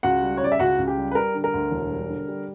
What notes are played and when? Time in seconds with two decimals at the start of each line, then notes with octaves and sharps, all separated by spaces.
0.03 C#2 F#4 F#5
0.23 G3
0.37 C#5
0.41 C#3 D5
0.52 E5
0.59 C#2 F#4 F#5
0.78 C#2
0.88 G4
0.98 G3
1.11 B4
1.15 G3 A#4
1.34 D3
1.44 A#4
1.54 D2
1.71 E1
1.91 G3
2.09 D3
2.28 G3